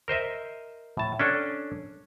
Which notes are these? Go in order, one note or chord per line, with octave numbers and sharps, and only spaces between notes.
A#4 C5 D#5 E5
A2 A5
C#4 D4 A4